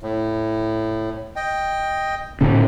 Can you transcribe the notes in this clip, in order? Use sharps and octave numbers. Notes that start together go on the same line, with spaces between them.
A2
D#5 G5
A2 D3 C#4